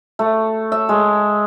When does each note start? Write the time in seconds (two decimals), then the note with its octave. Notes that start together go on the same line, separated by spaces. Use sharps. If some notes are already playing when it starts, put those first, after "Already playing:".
0.19 A3
0.72 E5
0.89 G#3